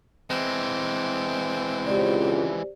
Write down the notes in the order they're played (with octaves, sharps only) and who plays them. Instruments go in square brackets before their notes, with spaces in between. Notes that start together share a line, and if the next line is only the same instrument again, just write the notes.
[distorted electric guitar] E3 G#3 [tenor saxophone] C4
[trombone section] C#2 [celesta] G4 C5 D5